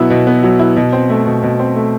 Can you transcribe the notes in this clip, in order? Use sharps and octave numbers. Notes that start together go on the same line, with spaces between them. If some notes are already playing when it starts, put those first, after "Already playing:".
Already playing: B2 F#3 B3 E4
B2
B3
F#3
E4
B2
C4
A3
B2
B2
C4
A3